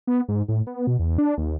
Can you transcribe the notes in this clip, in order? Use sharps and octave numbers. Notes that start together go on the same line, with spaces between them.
B3
G#2
A2
B3
B2
E2
D4
D#2